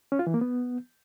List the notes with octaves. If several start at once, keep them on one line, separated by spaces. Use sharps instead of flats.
C#4
F4
E3
A#3
B3